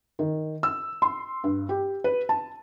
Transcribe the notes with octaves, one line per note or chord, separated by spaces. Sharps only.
D#3
E6
C6
G2
G4
B4
A5